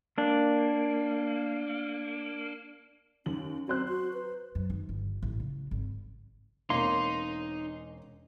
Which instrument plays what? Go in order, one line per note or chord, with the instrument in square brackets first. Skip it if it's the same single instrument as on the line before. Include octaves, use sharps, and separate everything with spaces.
[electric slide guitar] A#3 D4
[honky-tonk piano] D#2 F#7 [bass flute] C#4
[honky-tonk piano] F#3 C5 F#6 [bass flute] C4
[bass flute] F#4
B4
[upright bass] F#2
D#3
G1
A1
C#3
G#1
[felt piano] E1 C4 C#4 [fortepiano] A#3 [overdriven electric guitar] D#4 [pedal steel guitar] C6